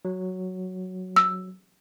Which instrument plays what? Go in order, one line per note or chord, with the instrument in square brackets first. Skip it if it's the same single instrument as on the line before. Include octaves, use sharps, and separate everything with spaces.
[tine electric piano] F#3
[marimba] E6